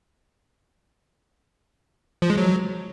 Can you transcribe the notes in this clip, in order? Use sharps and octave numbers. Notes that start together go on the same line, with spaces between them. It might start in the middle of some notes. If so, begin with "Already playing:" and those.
F3
G#3
F#3